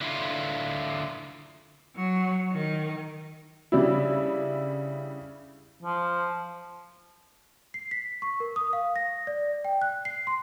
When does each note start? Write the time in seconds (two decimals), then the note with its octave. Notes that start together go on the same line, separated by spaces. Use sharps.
0.01 D3 E4 F4
1.96 F#3
2.53 D#3
3.72 C#3 G3 D4 E4
5.83 F3
7.74 C7
7.91 B6
8.22 C#6
8.40 A#4
8.56 D#6
8.73 F5
8.96 A#6
9.27 D5
9.65 G5
9.82 F#6
10.05 C7
10.27 C6